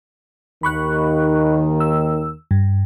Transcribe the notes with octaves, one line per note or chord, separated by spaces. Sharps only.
D#2 D#3 B5 C#6 F#6
E6
G2